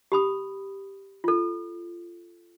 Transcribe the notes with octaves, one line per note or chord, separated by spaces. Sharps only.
G4 B5 D#6
F4 A4